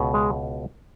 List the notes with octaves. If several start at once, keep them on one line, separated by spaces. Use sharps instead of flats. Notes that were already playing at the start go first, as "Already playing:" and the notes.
Already playing: C#2 B2
G#3